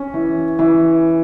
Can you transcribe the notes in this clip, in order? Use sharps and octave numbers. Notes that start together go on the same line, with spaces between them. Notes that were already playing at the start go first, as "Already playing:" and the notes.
Already playing: C#4
E3
E3